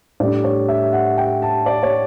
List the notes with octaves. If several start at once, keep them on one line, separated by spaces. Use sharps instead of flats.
A2 G3 D4 D5
C#5
E5
F#5
G5
A5
D5
C#5